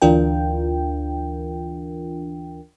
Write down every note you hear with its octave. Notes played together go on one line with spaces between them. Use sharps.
D2 E3 D4 F4 A#4 G5